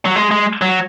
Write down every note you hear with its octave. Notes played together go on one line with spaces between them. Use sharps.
F#3
G#3
G#3
F#3